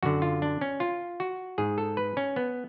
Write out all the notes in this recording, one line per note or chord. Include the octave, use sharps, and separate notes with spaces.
F#2 D3 F#4
F4
D4
C#4
F4
F#4
G#2 G#4
A4
B4
C#4
B3